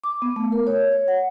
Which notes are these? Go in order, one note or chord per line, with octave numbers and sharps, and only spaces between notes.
D6
B3
A3
A#4
C#5
C#5
F#5